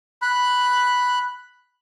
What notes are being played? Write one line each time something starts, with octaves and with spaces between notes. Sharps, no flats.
B5 F#6